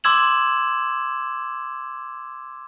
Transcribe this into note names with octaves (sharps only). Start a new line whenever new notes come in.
C6 D6 E6 G#6 E7 F#7